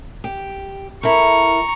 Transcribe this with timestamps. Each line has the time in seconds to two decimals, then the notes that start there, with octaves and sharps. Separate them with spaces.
0.24 G4
1.03 E4 A4 A#4 A#5 C#6